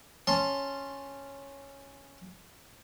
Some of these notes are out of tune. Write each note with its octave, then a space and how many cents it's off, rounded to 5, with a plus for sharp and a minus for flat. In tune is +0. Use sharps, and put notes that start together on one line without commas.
C#4 +0 A5 +0 C6 +10